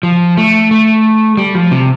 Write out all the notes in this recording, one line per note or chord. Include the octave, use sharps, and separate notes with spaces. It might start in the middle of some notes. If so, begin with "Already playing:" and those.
F3
A3
A3
G3
F3
C3